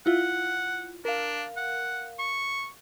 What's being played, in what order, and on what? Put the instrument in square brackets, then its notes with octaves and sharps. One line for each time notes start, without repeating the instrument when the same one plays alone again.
[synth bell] E4 F4 [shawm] F#5
[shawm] D4 [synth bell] A#4 F5
[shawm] F#5
C#6